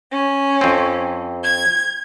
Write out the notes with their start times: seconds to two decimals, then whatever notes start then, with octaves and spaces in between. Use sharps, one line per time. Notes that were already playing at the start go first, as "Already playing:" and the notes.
0.11 C#4
0.61 F2 C4
1.43 G#6